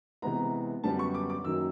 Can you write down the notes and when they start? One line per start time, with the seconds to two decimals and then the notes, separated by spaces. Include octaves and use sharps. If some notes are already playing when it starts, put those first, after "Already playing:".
0.22 C3 E3 G#3 B3 A#5
0.83 F#2 D3 G3 B3 A5
0.99 C#6
1.14 D6
1.30 D6
1.44 F#2 D#3 F#3 A#3 E6